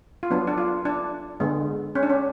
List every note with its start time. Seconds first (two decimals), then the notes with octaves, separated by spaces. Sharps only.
0.23 F4
0.30 F#3 B3 D4
0.47 D4
0.58 F4
0.85 D4
1.40 D3 G#3 B3
1.95 C#4
2.03 D4
2.10 C#4